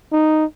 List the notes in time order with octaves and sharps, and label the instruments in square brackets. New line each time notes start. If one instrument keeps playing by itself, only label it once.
[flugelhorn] D#4